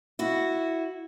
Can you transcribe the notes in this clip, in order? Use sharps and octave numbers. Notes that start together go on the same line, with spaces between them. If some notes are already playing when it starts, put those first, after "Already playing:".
E4 F#4